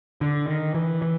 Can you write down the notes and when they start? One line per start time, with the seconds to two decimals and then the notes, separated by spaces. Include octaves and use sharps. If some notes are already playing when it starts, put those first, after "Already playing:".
0.21 D3
0.48 D#3
0.74 E3
1.02 E3